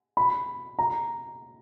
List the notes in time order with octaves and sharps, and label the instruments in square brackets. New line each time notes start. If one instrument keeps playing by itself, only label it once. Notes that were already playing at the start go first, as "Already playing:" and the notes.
[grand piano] B5
A#5